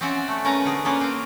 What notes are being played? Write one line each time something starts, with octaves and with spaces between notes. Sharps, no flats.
C4 C#4 D5 E5 F#5 G#5
A3
C#4 A#4 B4 G#5 A#5
D3 G#4
A#3 C#4 F4 G#4 A#4 B4
C4